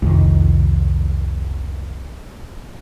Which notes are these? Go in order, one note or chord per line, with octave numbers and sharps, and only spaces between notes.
C2 F2 D#3